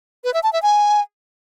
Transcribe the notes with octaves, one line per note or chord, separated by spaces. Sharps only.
B4
E5
A5
E5
G#5